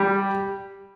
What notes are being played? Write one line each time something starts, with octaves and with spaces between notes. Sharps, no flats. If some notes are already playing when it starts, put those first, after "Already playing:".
Already playing: G3